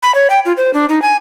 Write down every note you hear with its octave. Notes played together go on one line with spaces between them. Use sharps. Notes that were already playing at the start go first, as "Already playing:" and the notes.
B5
C#5
G5
F4
C5
D4
D#4
G#5